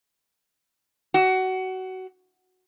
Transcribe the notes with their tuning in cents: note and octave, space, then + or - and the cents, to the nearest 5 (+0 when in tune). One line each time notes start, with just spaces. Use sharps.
F#4 +20